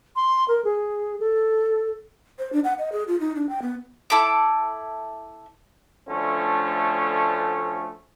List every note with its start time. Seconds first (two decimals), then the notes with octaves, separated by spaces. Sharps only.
0.16 C6
0.48 A#4
0.64 G#4
1.20 A4
2.39 C5
2.53 D4
2.64 F#5
2.79 D#5
2.92 G#4
3.08 F4
3.20 D#4
3.36 D4
3.49 G5
3.62 B3
4.10 E4 A4 B5 D6
6.09 D2 D3 F3 A3 C#4